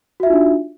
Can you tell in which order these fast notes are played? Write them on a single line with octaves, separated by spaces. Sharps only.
F#4 E5 F4 D#4 D4